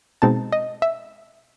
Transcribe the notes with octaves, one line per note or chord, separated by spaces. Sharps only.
B2 G#3 C4 D#4 A5
D#5
E5